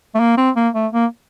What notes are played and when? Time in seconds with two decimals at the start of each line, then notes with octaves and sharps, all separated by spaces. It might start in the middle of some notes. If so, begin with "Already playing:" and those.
0.15 A3
0.20 A#3
0.37 C4
0.56 A#3
0.74 A3
0.93 A#3